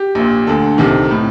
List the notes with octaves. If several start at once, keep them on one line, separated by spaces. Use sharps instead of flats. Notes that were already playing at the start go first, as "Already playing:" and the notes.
Already playing: G4
A#1 A#2
D2 D3 A4
C2 C3 D#3
A2